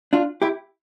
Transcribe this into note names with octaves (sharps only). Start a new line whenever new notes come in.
D4 F4
E4 G4